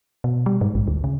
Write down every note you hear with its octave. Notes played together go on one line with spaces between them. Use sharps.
B2
G3
G#2
A#1
D2
C#3